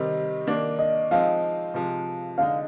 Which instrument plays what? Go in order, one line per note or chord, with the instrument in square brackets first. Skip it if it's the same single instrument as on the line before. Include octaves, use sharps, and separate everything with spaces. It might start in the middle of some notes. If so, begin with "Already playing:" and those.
Already playing: [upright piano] C3 D#3 G3 C4 D#4
D#3 A#3 D4
[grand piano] D#5
[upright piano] F3 G#3 C4 D#4 [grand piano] F5
[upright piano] C3 F3 G#3
[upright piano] D3 G#3 D#4 [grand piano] F5